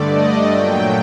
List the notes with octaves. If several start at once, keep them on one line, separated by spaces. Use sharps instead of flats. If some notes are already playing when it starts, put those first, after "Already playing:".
Already playing: G2 D3 A3 D5
D#5
A#2 F#3 A3 G5